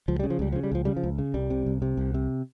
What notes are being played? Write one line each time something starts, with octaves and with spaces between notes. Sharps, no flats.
C#2 F3
C#3 G3
F3
C#2 G3
C#3 F3
G3
C#2 F3
C#3 G3
F3
C#2
C#3
C2 G3
C3
C2
C3
C2
C3